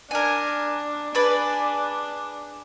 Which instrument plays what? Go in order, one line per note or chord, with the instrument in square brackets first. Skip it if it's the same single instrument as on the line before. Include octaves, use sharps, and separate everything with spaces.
[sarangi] D4 [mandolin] A#4 G#5
[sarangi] D4 [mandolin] G#4 B4 D5